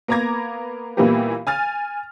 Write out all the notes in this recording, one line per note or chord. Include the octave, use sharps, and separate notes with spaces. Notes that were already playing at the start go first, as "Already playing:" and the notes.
A#3 B3 A#5 D6 G#6 A#6
A#2 E3 G3 A#3 B3 G4
G#5 F6 A6